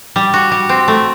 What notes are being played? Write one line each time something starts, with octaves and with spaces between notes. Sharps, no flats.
G3
F#4
G3
C4
A3